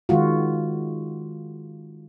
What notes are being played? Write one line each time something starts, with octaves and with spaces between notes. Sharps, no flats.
D#3 G#3 F4 F#4